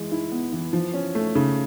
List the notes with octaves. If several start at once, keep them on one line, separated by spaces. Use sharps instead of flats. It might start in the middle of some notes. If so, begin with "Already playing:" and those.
Already playing: E3 G#3
E4
B3
E3
F3
C#4
A3
C#3